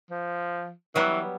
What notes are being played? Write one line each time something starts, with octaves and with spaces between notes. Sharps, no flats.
F3
E3 F#3 G3 B3